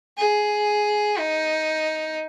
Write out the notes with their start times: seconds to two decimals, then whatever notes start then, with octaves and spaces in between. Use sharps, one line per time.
0.17 G#4
1.18 D#4